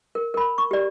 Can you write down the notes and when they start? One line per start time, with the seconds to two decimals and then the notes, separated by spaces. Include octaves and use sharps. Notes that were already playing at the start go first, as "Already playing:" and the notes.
0.15 A#4
0.34 A#4 B5
0.58 C#6
0.71 G4 D5